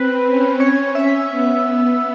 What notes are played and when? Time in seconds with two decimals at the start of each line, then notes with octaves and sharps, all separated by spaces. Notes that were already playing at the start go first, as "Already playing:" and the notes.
Already playing: C4 B4
0.25 C#4
0.60 C#4 C#5
0.95 E5
1.30 B3